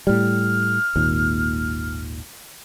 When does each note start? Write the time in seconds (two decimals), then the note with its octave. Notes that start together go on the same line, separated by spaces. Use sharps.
0.07 A2 G3 F6
0.95 G#1 D#2 A#2